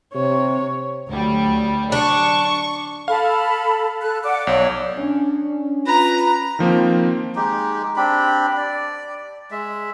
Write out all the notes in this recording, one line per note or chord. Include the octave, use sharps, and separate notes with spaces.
C3 C#5
D2 F#3 G3
D4 C#6
A4 F5 B5
A4 F#6
D5 F#5 D6
B1 C#5 D5
C#4 D4
F4 B4 A#5
D#3 F3 A#3 C4
G#3 D#4 G4
C4 D4 G4 B5
D5
G#3 E5